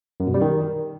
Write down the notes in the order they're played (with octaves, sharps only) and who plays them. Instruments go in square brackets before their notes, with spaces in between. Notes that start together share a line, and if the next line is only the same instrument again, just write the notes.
[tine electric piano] F#2
B2
G3
D#3